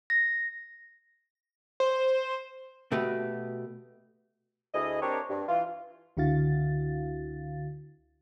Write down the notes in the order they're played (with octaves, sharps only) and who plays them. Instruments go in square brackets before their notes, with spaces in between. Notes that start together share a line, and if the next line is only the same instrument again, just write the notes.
[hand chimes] A#6
[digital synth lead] C5
[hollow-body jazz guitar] B2 A3 F#4 G4 B4
[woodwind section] D2 E4 G#4 D#5
C4 D4 G4 A#4 C#5
G2
E3 F4
[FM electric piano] C#2 D3 E4 F#4 F5 A6